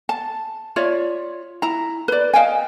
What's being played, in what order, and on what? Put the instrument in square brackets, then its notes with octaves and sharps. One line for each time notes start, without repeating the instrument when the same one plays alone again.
[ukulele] A5
F4 C#5 D5 E5
E4 A#5
B4 D5
D#5 F5 G5 G#5